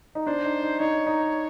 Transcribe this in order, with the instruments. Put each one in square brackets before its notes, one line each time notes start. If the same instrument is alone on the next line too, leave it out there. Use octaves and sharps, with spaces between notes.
[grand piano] D#4
[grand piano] D4 [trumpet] C5
[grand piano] D#4
D#4
[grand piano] D#4 [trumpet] C#5
[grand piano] D#4